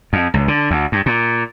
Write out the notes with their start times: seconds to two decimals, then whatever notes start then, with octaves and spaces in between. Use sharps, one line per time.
0.13 F2
0.34 C#2
0.48 D3
0.71 D2
0.92 G2
1.06 A#2